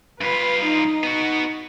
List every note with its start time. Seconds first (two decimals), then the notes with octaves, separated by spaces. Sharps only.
0.21 G2 F4 B4
0.64 D#4
1.03 B3 F#4